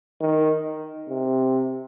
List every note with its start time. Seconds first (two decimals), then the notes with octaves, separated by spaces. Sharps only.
0.21 D#3
1.09 C3